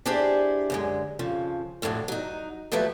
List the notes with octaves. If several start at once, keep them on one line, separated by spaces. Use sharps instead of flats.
D4 E4 G4 G#4 C5 D5
F#2 D3 G#3
F2 C#3 F3
F2 A2 D3 E3 F#3
F#3 D#4
D#2 F3 F#3 A3 B4 E5